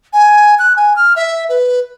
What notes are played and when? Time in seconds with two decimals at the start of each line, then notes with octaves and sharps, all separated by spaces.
0.13 G#5
0.59 F#6
0.76 G#5
0.96 F6
1.16 E5
1.49 B4